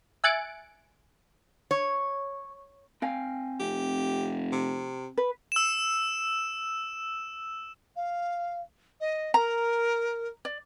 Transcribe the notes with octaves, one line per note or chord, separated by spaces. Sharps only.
E5 G#5 F#6 A6 C#7 D7
C#5
C4 F5 G5 G#5
F1 G4
C3
B4
E6 E7
F5
D#5
A#4 A#5
D5